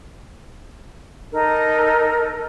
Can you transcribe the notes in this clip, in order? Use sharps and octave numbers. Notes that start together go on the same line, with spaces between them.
D#4 A4 A#4